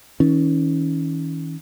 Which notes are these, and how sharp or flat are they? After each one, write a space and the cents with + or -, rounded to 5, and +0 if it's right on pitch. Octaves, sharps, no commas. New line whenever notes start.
D#3 +45 C#4 +0